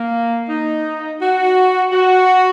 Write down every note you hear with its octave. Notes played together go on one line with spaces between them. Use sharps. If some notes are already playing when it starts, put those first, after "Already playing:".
Already playing: A#3
D#4
F#4
F#4